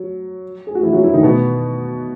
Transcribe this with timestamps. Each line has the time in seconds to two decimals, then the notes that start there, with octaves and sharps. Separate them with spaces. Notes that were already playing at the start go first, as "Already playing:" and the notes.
Already playing: F#3
0.67 G#4
0.75 F#4
0.83 E3 E4
0.93 F#3 F#4
1.04 E3 E4
1.14 D#3 D#4
1.23 B2 B3